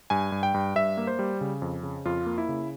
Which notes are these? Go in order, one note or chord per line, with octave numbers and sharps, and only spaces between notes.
G2 G#5
G2
G5
G2
G2 E5
A#3
C5
G3
C#3
F2
C#3
F2 F4
A#3
E4
C#3